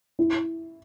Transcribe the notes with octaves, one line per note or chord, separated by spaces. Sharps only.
E4